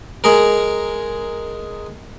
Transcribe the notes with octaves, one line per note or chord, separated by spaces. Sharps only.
G#3 G#4 A#4